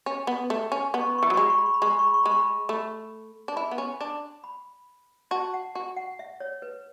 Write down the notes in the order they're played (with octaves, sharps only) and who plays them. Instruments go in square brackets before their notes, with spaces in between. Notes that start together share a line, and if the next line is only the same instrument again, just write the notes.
[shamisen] C#4 [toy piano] G#5
[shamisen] B3
A3
C#4
[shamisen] B3 [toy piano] B5
[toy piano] C#6
B5
C#6
[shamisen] E3
[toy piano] B5
[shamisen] F#3
[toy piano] C#6
[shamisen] G#3 [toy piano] B5
[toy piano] C#6
B5
C#6
B5
[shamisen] G#3 [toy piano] C#6
[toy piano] B5
C#6
B5
C#6
[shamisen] G#3 [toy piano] B5
[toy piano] C#6
B5
[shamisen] A3 [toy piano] B5
[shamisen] D4
[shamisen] E4 [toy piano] B5
[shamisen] B3
C#4
D4
[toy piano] B5
[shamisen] F#4 [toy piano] A5
[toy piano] F#5
[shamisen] F#4 [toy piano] G#5
[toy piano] F#5
E5
C#5
B4